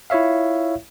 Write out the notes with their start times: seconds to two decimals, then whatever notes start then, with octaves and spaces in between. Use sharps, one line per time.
0.10 E4 F4 C#5 E5 F5